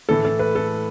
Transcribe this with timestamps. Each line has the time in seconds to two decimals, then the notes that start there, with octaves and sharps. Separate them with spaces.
0.09 A2 E3 A3 A4
0.25 A4
0.39 B4
0.55 A4